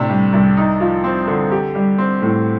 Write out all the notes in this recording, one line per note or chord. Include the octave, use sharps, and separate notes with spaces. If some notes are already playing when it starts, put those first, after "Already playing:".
Already playing: A2 C3 D4
G3
C2
D#4
F3
C4
D3
G4
G3
C4
A2